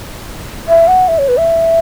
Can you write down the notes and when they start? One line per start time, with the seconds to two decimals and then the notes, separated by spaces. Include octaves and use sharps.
0.68 E5
0.88 F#5
1.08 E5
1.18 C#5
1.28 B4
1.38 E5